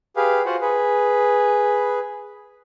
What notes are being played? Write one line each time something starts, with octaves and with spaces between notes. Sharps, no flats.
G4 G#4 B4 F5
F4 F#4 C5 F#5
G#4 B4